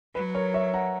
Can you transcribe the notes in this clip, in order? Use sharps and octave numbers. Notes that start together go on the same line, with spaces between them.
F#3 B4
A#4 C#5
C#5 E5
F#5 A#5